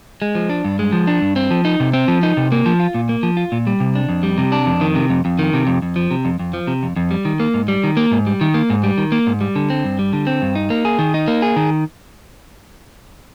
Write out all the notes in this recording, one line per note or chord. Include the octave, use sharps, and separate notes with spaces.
G#3
F3
D4
G2
G#3
F3
D4
G2
C4
F3
D#4
C3
C4
F3
D#4
C3
A#3
F3
F4
A#2
A#3
F3
F4
A#2
G3
C3
D4
F2
G3
C3
D4
F2
D#3
C3
F2
F2
D#3
C3
F2
F2
F3
C3
F2
F2
F3
C3
F2
F2
G3
D#3
A#3
G#2
G3
D#3
A#3
G#2
G3
D#3
A#3
G#2
G3
D#3
A#3
G#2
G3
D3
C4
G2
G3
D3
C4
G2
D#4
A#3
G#4
D#3
D#4
A#3
G#4
D#3